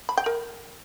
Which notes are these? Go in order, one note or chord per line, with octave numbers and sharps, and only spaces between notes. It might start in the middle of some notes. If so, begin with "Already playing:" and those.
B5
G5
A#4